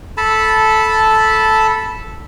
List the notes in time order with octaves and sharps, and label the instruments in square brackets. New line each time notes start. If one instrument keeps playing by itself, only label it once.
[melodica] A4 A5 B5